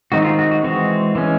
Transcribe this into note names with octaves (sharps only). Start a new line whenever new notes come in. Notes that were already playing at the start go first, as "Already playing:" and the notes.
D#3 G#3 C4 D#4 F#4
F4
F#4
F#4
E3 G#3 C4 F#4
E3 G#3 C#4